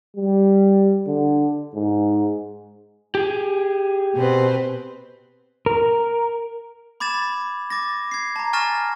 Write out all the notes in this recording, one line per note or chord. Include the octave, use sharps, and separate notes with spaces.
G3
D3
G#2
G4 G#4
B2 C4 B4
A#4
B5 D6 G#6 A6 E7
B5
D6 A6 A#6
G#6 C7
A5 A#5
G#5 C#6 F6 A6 A#6 E7